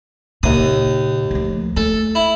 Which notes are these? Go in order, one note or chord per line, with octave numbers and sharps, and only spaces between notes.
D#2 A#2 C#3 D#6
D2 F3
A3 A4
E4